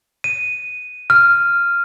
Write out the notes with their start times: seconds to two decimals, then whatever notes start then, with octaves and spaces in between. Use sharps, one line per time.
0.24 D#7
1.10 F6